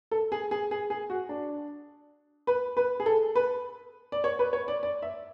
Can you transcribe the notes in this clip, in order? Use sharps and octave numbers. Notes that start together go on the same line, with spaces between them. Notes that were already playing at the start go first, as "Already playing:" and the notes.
A4
G#4
G#4
G#4
G#4
F#4
D4
B4
B4
G#4
A4
B4
D5
C#5
B4
C#5
D5
D5
E5